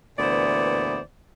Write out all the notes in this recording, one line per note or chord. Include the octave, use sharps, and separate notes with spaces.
D2 A#2 E3 B3 C5 D5